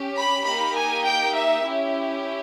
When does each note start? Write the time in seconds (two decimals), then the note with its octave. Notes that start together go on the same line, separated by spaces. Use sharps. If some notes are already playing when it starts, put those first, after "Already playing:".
Already playing: C#4 G4
0.17 B5
0.46 A#3 D#4 G4 B5
0.75 G#5
1.05 G5
1.35 E5
1.65 C#4 E4 G4